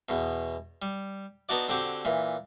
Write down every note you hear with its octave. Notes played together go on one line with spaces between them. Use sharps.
E2 B2
G3
B3 D4 D#4 F#4 D5
D3 C4 F#4 G4
A#2 E3